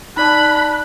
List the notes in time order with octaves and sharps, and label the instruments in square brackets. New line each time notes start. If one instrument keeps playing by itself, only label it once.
[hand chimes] D#4 D5 A5 [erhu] B5 [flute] F#6